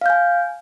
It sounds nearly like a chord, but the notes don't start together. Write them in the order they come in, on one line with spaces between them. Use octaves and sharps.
F5 G6 G#5